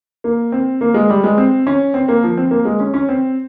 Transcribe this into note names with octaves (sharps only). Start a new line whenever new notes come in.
A#3
C4
A#3
G#3
G3
G#3
C4
C#4
C4
A#3
F3
C4
A#3
G#3
C#4
C#4
C4